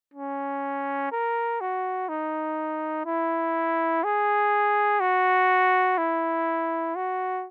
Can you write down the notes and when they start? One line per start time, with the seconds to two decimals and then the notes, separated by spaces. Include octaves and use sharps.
0.14 C#4
1.12 A#4
1.61 F#4
2.09 D#4
3.06 E4
4.04 G#4
5.00 F#4
5.98 E4
6.96 F#4